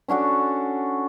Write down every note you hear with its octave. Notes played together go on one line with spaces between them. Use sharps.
C#4 D4 F#4 A4